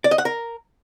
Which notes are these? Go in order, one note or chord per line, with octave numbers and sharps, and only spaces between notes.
D5
D#5
F#5
A#4